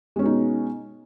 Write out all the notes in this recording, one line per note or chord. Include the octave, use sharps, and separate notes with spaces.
B2 G#3 C#4 D#4